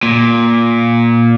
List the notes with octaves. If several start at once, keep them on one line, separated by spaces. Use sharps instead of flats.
A#2